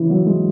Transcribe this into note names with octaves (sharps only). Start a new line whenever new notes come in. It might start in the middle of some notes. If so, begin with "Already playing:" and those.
Already playing: C#3 E3
F#3
G#3